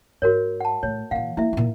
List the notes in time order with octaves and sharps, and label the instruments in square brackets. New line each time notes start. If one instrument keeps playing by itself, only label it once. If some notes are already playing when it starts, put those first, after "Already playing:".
[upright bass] G#2 [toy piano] F#4 A#4 C#5
[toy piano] F#5 A5
[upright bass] A2 [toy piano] C#5
[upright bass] A#2 E3 [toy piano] F5 F#5
[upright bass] A#3 [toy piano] E4 E5
[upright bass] A#2 D#4